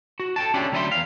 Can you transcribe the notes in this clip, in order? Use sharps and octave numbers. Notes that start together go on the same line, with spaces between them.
F#4
A4 G5 A5
C#4 D4 E4 F4 G4
D2 F#3 G3 D#5 E5 C6
E2 F5